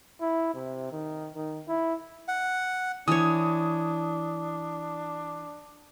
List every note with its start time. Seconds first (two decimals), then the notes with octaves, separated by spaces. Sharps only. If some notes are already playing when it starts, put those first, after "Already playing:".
0.21 E4
0.54 C3
0.92 D#3
1.35 D#3
1.68 E4
2.28 F#5
3.08 E3 D4 C#5 D#6